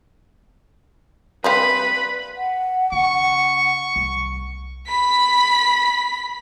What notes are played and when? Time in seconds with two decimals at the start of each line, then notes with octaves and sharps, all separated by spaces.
1.44 G3 C4 B4 F5 B5
2.37 F#5
2.92 C#3 C#6
3.96 C2
4.87 B5 B6